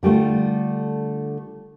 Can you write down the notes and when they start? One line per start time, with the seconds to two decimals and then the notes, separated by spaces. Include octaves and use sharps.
0.03 D3 G3 A3 F4